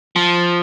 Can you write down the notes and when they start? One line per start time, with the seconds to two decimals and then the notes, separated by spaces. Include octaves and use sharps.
0.16 F3